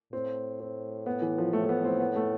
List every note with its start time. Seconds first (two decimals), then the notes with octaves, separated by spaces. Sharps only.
0.13 A2 C4
0.60 C4
1.06 B3
1.22 E3
1.38 F3
1.53 A2 A3
1.65 A3
1.69 B3
1.85 C4
2.00 B3
2.16 A3